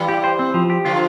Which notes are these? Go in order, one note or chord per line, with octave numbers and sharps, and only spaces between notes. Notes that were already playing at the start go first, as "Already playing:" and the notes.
Already playing: E3 G3
G4
C5
C4
F3
G4
D3 F3 F4